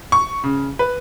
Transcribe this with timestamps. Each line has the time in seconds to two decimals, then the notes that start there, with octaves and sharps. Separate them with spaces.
0.12 C#6
0.44 C#3
0.79 B4